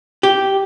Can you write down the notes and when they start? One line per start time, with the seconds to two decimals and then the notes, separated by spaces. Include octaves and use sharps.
0.23 G4